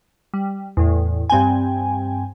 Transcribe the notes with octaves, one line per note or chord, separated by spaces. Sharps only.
G3
E2 A2
G2 C4 G5 G#5